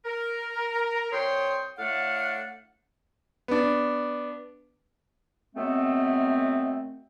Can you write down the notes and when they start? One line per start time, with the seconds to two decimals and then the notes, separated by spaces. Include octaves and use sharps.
0.05 A#4
1.12 C2 C#5 G5 C6 D#6
1.78 A2 A3 D4 F5 F#5
3.48 B3 D4
5.55 F#2 G#3 A3 B3 C4